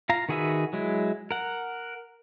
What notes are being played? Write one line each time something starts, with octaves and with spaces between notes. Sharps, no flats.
F4 F5 A#5
D#3 F#4 G#4 B4 E5
F#3 G#3 E4
A#4 F#5